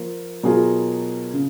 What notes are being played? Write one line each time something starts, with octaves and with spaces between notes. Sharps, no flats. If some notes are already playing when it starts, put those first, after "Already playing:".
Already playing: F3 A#3 F4
B2 F#3 A#3 F4 G#4
C#3